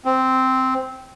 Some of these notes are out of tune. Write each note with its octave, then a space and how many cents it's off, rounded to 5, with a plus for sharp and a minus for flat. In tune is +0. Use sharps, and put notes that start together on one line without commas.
C4 -5